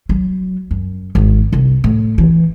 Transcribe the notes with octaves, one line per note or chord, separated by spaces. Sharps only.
F#3
F#2
G#1
C2
A2
E3